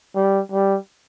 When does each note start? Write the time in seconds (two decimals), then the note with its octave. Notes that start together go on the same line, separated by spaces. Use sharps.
0.16 G3
0.52 G3